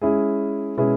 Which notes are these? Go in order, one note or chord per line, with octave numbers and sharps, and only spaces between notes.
G#3 C#4 E4 G#4
B2 G#3 C#4 E4 G#4